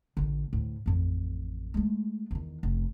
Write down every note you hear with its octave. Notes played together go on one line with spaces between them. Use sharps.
A1 D3
D2 A2
A1 F2
G#3 A3
E2 D#3
F1